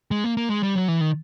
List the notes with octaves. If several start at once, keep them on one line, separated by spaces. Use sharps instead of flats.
G#3
A#3
A#3
G#3
G3
F#3
E3
D#3